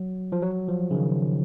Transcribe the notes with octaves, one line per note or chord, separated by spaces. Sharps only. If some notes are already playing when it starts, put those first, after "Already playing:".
Already playing: F#3
F3
F#3
F3
C#3
D#3